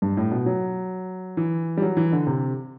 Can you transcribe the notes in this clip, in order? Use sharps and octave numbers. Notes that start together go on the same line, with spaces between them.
G2
A2
B2
F#3
E3
G3
F#3
E3
D3
C3